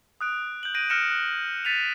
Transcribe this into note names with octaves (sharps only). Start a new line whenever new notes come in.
D#6 F#6 D7
G6 F#7
G6 A#6 D7 D#7
F6 F#6 A#6 C#7 D7 E7
F#6
A6 B6 C#7 D#7 F7